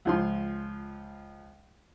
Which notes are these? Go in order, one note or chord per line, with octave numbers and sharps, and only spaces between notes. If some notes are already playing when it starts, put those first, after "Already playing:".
C#2 F3 C6